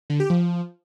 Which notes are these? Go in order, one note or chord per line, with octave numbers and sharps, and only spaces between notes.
D3
G4
F3